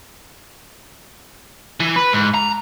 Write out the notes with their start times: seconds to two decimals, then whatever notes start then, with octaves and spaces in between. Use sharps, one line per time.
1.80 E3
1.96 B4
2.13 G#2
2.34 A#5